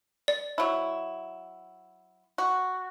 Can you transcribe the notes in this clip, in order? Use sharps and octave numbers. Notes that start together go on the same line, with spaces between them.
D5
F#3 E4
F#4